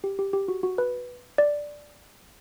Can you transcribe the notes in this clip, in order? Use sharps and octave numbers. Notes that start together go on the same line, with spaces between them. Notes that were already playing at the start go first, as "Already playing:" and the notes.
G4
G4
G4
F#4
F#4
B4
D5